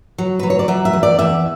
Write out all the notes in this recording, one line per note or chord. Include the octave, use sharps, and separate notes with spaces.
F#3
F#3 B4
C#5
D5
F#3 E5
E5
E2
D5
E2 E5